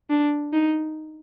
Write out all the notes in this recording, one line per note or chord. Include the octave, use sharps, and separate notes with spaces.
D4
D#4